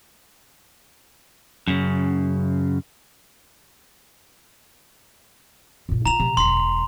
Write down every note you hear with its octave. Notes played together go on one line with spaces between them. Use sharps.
F#2 C#3
G2 A#2
E4 F4 A#5 F7
C3 A3
E1 F#2 C6